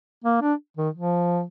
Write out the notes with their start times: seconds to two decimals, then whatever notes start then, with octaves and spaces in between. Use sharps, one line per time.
0.24 A#3
0.41 D4
0.77 D#3
0.94 F3